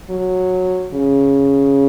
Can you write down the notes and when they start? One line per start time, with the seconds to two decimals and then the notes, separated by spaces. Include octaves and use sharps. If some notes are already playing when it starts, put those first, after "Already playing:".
0.10 F#3
0.93 C#3